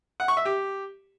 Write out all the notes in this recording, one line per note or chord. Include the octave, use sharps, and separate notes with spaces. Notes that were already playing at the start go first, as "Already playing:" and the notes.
F#5
C#6
E5
G4